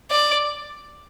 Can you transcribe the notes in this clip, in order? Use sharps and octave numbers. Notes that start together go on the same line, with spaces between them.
D5